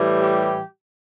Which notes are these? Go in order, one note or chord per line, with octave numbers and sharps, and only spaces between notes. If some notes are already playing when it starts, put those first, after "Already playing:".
Already playing: A2 E3 G3
G4